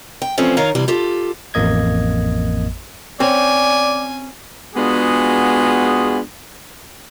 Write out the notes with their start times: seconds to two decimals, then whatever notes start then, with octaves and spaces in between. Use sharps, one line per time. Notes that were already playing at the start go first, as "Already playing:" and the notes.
0.22 G5
0.38 E3 F3 A3 C4 C#4 D5
0.57 D#3 D#4 A#4 C#5 F5
0.75 G2 C3 E3 G3
0.88 F4 G4 A4
1.54 A1 F2 A#3 D#5 G#6
3.20 C4 C#4 D5 G#5
4.75 G#3 B3 D4 F4 F#4 G#4